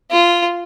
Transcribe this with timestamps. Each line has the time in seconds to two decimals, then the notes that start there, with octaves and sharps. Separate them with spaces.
0.11 F4